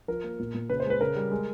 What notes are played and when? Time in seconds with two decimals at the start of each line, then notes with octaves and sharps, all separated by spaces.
0.08 F3 A#4
0.24 A#3
0.39 A#2
0.54 A#2
0.70 C#3 B4
0.80 C5
0.85 G#3
0.90 B4
1.01 C#3 A#4
1.16 G3
1.31 G#3